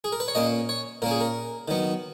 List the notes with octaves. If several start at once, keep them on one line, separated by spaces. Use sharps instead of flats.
G#4
A#4
B4
C#5
A#2 A#3 C#4 D#5
C#5
A#2 A#3 C#4 A#4
G#4
A#4
D#3 F#3 B3